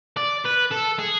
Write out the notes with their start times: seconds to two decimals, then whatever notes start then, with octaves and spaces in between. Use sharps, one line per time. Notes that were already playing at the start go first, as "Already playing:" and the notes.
0.17 D5
0.45 B4
0.72 A4
0.99 G#4